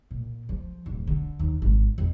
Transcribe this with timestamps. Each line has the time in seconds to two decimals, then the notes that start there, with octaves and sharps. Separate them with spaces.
0.11 A#2
0.49 F3
0.86 D1
1.07 D3
1.39 D#2
1.62 G#1
1.98 F2